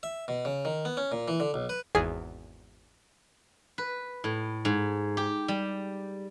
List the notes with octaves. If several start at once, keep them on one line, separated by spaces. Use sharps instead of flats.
E5
B2
C#3
D#3
B3
C#4
A#2
E3
D3
B1
B4
G#1 E2 G#4 G#5 D#7
B4
A2
G#2
G4
G3